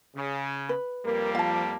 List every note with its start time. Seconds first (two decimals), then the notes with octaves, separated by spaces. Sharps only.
0.16 C#3
0.69 B4
1.06 F2 G3 A#3 A#4
1.35 F3 F5 A5